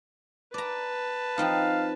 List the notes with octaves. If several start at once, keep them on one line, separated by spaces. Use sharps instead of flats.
B4 D5 A5 A#5
F3 C4 D#4 F5